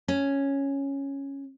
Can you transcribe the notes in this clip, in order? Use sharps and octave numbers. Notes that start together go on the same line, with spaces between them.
C#4